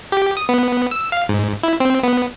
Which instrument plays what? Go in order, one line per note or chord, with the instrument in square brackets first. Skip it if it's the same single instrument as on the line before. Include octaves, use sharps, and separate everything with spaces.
[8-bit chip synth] G4
D#6
B3
E6
F5
G#2
E4
C4
B3